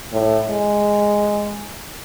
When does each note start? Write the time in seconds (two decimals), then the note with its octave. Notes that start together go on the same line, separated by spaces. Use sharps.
0.12 A2
0.50 G#3